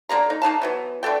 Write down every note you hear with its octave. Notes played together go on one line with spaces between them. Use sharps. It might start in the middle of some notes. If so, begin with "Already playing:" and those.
D3 A#3 A#4 A#5
D#4
A#3 D#4 F5 A5
E3 F#3 B3
D3 A3 A4 G5